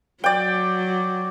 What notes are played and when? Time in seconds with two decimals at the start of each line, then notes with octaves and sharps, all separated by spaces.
0.24 F#3 D5 G5